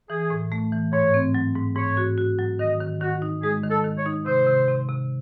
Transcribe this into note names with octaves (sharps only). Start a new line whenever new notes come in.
E3 G#4
A2
A3
E3
G#2 C#5
C4
F#3
G#2
G#2 C#5
F#4
F#4
F#3
D#3 D#5
D#3
D#3 F#4
D#4
G#3 G#4
D#3
A4
D#3
C#5
D#4
C3 C5
C3
C3
C3